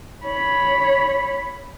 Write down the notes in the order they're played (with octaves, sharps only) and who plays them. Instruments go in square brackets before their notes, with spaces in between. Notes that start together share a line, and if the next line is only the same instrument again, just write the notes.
[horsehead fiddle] C#5 B5